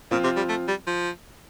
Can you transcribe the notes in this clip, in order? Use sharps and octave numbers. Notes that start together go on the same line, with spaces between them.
A#2 F3 C4 F4
C3
G3
A3
G3
F3